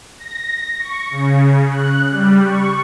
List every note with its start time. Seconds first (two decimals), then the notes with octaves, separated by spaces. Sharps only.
0.18 A#6
0.79 C#6
1.11 C#3
1.69 F#6
2.11 G3
2.44 C#6